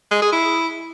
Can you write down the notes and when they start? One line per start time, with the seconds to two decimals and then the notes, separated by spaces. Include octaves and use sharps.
0.11 G#3
0.22 G#4
0.32 E4